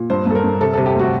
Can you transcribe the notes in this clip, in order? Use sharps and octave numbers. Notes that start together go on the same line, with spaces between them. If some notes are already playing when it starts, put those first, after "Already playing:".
Already playing: A#2
G2 C5
G2 A4
A#4
G2
C3 A4
C3 A4
G4
D2 F#4